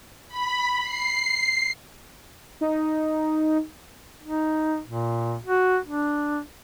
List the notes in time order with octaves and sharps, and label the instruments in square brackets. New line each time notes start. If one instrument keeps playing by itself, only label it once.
[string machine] B5
C7
[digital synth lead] D#4
[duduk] D#4
A#2
F#4
D4